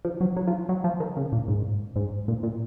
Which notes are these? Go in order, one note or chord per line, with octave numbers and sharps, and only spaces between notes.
F3
F#3
F#3
F3
F#3
F3
D#3
C#3
A#2
G#2
G#2
A#2
A#2